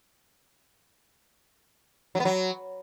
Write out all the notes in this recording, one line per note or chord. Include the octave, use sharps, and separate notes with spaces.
F#3
B3
F#3